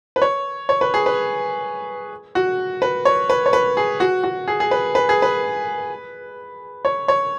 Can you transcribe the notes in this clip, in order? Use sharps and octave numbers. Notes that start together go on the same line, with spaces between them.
B4
C#5
C#5
B4
G#4
B4
F#4
B4
C#5
B4
C#5
B4
G#4
F#4
F#4
G#4
G#4
B4
B4
G#4
B4
C#5
C#5